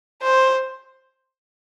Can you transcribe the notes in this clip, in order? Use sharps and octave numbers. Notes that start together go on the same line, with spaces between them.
C5